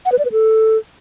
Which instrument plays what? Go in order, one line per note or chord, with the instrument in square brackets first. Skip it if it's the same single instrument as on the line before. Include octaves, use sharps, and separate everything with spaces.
[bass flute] F#5
B4
D5
B4
A4